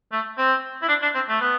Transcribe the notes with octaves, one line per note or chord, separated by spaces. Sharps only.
A3
C4
E4
D4
D4
C4
A3
B3